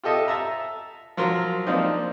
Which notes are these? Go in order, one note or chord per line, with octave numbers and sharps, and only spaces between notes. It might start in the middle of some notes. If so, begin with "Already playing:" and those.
F4 G4 A4 D#5 E5
E5 A5 A#5
F3 F#3 A#4 C6
F3 A#3 C4 D4 D#4